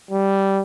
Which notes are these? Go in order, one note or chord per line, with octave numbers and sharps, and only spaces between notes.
G3